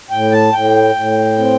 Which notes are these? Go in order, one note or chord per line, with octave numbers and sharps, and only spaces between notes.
A2 G5
A5
A2 G5
A2
C4